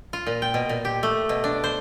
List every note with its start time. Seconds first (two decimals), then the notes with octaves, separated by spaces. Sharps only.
0.13 F4
0.26 A#2
0.42 G5
0.54 B2
0.69 A#2
0.85 G4
1.03 A3
1.29 B2
1.44 D4
1.64 C5